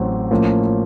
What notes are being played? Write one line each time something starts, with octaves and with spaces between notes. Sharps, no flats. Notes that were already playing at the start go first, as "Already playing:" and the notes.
Already playing: A1 A2 F#3 C4
A2 F3 A#3 C#4